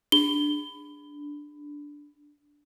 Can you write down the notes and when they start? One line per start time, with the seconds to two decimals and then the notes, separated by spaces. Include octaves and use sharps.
0.12 D4 G7